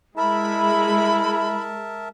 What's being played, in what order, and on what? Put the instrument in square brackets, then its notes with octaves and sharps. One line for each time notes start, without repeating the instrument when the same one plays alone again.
[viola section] G#3 [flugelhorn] E4 [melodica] A#4 E5 A5 [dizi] B5